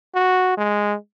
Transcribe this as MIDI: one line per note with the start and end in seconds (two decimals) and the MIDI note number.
0.15 0.53 66
0.58 0.94 56